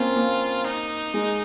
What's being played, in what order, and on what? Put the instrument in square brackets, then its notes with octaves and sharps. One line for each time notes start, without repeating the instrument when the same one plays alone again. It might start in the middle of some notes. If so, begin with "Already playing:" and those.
Already playing: [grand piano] A#3 C4 C#4 [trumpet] F4
[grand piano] A#3
[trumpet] D#4
[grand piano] G#3